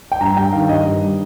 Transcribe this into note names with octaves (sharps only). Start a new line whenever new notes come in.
G5
G2 A#5
G2 G5
D#3 F5
G2 D#5
G2
G3